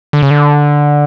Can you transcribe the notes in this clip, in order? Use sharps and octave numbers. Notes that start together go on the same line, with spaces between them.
D3
C#3
D3